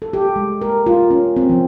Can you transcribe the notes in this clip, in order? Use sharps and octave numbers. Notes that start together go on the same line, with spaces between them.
A4
G4
G#3
A#4
F4
C#4
C4
F3